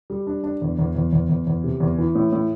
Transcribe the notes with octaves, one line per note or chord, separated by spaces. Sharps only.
G3
D4
D4
E2
E2
E2
E2
E2
E2
C3
E2
E3
A2
A2